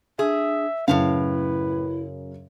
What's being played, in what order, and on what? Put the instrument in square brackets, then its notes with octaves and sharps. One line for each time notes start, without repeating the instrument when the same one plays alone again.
[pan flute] D4 [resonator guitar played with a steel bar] G#4 [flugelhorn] E5
[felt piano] F#2 C#3 [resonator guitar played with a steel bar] A2 A3 F5 [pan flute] E4 [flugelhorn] B4